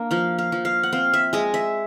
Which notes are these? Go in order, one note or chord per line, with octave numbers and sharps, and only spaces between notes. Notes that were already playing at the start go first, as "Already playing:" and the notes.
Already playing: A#3 D4
F3 F5
F5
F3
F5
F#5
C4 F5
E5
G#3 D#5
E5